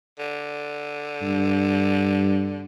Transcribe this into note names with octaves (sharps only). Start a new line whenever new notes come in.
D3
G2